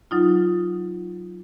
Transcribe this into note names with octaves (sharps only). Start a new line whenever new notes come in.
F#3 D#4 F4